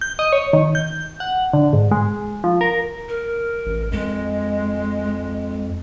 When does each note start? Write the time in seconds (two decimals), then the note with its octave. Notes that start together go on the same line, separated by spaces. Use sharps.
0.01 G6
0.19 D#5
0.33 C#5
0.53 D#3
0.75 G6
1.20 F#5
1.54 D3
1.73 G#2
1.91 G#3
2.44 F3
2.61 A#4
3.09 A#4
3.66 A1
3.92 F2 G#3